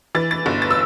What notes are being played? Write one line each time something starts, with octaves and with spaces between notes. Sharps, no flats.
E3 A6
A6
G1
A6
E6